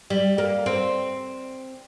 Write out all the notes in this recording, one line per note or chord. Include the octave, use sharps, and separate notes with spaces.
G3
A#3
C4